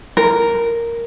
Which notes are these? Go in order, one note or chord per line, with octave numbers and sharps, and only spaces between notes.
A#4